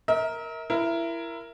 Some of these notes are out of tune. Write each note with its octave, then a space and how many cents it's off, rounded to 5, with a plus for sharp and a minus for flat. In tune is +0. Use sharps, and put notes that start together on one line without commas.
A#4 +0 E5 -40
E4 +20 A#4 +0